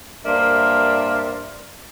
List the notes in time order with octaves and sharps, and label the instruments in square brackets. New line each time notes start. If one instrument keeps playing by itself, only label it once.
[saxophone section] G2 A#3 A#4 C5 D5 E5